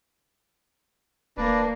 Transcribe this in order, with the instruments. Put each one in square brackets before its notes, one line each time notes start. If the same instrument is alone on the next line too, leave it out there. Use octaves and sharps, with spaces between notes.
[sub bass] D#1 [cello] A#3 [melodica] D4 B4 D5